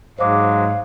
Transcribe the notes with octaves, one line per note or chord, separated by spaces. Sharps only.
G#2 F#3 G#3 C5 F5 D6